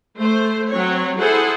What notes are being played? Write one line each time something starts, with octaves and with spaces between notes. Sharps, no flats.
A3 C5
F#3 C4 C#5
E4 G#4 A4 C5 F#5